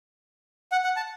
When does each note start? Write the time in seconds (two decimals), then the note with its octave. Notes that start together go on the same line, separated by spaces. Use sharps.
0.72 F#5
0.84 F#5
0.96 A5